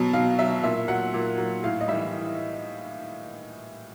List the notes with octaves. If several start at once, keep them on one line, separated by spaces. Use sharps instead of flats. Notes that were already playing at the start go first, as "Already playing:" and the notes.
Already playing: B2 F#3
B2 F5
F#3 E5
A#2 E5
F#3 F#5
A#2
F#3
A2 F5
D#5
E3 G3 E5